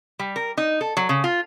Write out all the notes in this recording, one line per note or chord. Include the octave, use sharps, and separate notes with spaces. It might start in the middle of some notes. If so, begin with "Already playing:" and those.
G3
A#4
D#4
A4
F#3
C#3
F4